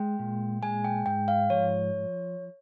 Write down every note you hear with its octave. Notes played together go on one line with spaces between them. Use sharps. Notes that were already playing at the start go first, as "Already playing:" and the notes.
Already playing: G#3 G5
A#2
G#3 G#5
G5
G#2 G5
F5
F3 C#5